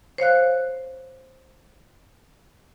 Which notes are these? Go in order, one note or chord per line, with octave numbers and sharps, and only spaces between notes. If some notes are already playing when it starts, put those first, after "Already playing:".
C5 C#5 F5 F#6